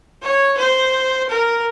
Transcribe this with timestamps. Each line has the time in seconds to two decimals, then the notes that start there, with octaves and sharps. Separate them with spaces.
0.22 C#5
0.58 C5
1.30 A#4